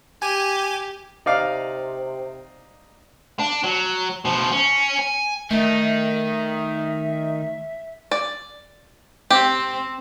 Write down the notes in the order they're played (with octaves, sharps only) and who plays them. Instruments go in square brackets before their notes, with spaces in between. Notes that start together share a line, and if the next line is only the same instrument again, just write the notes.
[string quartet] G4 [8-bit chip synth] G#5
[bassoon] C3 [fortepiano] D#4 D5 F5
[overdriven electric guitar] D4
F#3
B2 F3
C#4
G#5
[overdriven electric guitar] D#3 D#4 [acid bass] A3 [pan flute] E5
[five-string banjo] D5
[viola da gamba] C4 [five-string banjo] G4